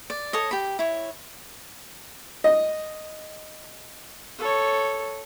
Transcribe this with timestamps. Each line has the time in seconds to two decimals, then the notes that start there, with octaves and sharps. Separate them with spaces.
0.10 D5
0.33 A4 C#5 D#5
0.51 G4 B5
0.79 E4 C#5
2.44 D#5
4.39 A4 C#5